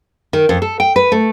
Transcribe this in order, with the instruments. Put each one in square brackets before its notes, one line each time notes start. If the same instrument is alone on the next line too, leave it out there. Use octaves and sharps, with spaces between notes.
[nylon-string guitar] D#3
F2
A4
G5
B4
A3